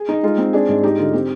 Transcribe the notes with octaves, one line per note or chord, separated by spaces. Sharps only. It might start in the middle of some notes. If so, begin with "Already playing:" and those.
Already playing: G#4
D#4
G#3 F4
C4
D4 G#4
G#2
D#4 G4
D3 F4
C4 G4